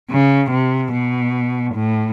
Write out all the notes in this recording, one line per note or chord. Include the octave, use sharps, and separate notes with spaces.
C#3
C3
B2
A2